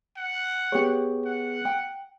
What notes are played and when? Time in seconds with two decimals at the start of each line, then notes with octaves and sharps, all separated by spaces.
0.17 F#5
0.72 B3 G4 G#4 C#5
1.25 F#5
1.65 G5